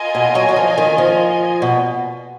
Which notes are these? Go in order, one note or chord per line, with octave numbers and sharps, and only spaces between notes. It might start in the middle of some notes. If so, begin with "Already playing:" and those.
Already playing: F4 A#4 D#5 G#5
B2
F#3
F#3
F3
D#3
F3
B2